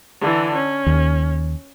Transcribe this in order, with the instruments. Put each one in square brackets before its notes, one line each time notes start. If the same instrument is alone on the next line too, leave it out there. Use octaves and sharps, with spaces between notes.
[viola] D3 E3
C#4
[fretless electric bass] D#2